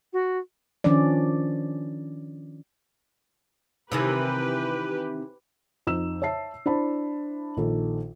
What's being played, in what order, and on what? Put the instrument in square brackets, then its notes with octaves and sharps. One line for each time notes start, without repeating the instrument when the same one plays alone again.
[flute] F#4
[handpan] D#3 F3 C#4 D4 D5
[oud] C3 D#3 E3 [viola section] G4 B4
[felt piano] F2 D#4 E6 E7
C#5 E5 A5 C7
D4 E4 C5 A5 B5
A#1 D#3 A4